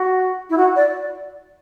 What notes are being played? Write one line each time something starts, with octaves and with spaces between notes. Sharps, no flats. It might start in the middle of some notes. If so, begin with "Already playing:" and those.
Already playing: F#4
E4
F#4
D5